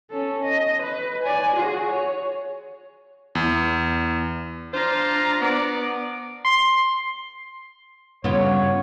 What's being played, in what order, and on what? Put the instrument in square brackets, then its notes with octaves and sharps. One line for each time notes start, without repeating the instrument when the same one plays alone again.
[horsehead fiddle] C#4 A4
D#5
B4
D5 G#5
F#4 G#4
C#5
[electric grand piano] E2
[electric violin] D4 A#5 [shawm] F4 [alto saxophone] C5
[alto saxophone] B3 [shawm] D5
[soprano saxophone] C6
[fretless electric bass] G2 [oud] C#3 F4 [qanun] B3 [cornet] C#5